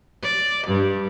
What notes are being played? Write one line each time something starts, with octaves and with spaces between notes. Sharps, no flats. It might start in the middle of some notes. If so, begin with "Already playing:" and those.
D5
G2